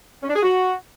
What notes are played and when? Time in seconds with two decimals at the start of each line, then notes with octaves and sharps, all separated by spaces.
0.22 C#4
0.29 D4
0.35 G#4
0.42 F#4